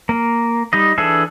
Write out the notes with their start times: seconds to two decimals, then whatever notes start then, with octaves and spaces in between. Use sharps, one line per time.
0.09 A#3
0.73 G3 D#4 D#5
0.98 E3 D4 G#4 A4 E5